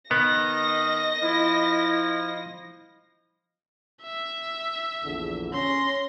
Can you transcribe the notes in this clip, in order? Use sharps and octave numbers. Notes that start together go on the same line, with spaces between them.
D#3 B3 D#5 A#6
F3 E4
E5
A#1 E2 D3
C#4 C6 A#6